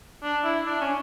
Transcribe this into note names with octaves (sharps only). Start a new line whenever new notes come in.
D4
E4
D4
C#4